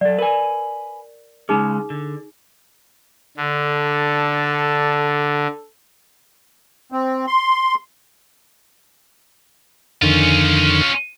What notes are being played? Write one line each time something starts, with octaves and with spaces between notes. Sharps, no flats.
F#3 A4 D5
A#4 B4 G#5
C#3 G#3 C#4 D#4 G#4
D3
D3 D4 A4
C4
C6
F2 D3 D#3 C#4 F4